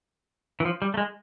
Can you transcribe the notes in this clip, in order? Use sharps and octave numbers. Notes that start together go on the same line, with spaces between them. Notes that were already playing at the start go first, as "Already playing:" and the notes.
E3
F3
G3
A3
G#3